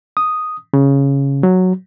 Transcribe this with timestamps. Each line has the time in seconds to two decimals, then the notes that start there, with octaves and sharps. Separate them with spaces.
0.17 D#6
0.73 C#3
1.43 F#3